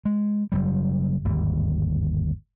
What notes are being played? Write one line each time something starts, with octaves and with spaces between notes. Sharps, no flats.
G#3
F#1 F#2 G3
G1 D#2 G#2